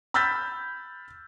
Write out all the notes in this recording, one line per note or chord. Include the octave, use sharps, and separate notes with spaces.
B5 E6 F6 G6 A6 B6